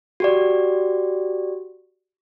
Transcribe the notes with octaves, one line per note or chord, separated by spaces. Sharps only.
F#4 G4 D5